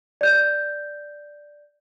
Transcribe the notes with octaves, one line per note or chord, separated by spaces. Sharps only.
D5 G6